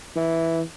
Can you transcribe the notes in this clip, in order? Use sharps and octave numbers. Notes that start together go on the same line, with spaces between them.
E3